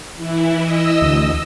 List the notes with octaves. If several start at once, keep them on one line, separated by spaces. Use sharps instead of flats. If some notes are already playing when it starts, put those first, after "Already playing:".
E3 E4
D#5 E6
D2